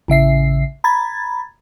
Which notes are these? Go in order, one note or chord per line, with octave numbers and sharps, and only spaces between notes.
A1 C#3 E5 C7
A#5 B5 G#6 A6